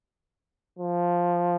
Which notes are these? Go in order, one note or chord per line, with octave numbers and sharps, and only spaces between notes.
F3